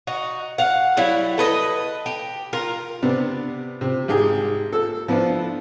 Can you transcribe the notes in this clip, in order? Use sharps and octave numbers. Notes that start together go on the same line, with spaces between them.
D#4 F#4
F5 F#5
F#3 G3 E4
A4 B4 D#5
G4
F4 A#4
C3 B3 D4
C3
G#1 G4 G#4
A4 E6
F3 B3 D4 E4 F4